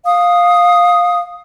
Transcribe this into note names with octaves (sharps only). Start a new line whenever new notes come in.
F5 D#6